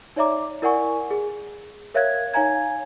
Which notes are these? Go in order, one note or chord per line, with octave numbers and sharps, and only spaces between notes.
D#4 C#5 D5 E5 A#5 D6
E4 A#4 D5 F#5 G#5 C#6
G#4
A#4 C#5 E5 F5 F#6 G#6
D#4 C#5 F5 G#5 A#5 G#6